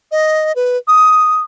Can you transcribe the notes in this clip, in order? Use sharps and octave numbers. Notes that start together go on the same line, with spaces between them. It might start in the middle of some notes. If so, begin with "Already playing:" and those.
D#5
B4
D#6